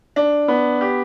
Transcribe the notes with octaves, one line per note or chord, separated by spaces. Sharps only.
D4
B3
G4